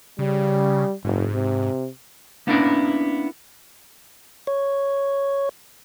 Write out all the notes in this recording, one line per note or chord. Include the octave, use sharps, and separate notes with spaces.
C#3 G3
F#1 G#2
C3
A#3 B3 C#4 D4 E4 A#4
C#5